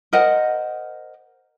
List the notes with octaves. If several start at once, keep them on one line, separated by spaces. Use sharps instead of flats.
A#4 C5 D#5 F#5